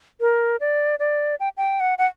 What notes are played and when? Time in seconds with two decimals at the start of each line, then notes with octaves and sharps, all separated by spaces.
0.21 A#4
0.60 D5
0.99 D5
1.40 G5
1.57 G5
1.80 F#5
1.98 F#5